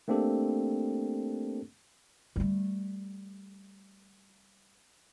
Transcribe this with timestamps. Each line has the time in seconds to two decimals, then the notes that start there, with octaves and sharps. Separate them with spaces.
0.08 A3 A#3 C4 D4 G4 A4
2.36 G3 A3